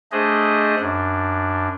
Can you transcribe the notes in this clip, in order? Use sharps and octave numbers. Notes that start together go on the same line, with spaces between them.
A3 D4 G#4 C5 D#5
F#2 D4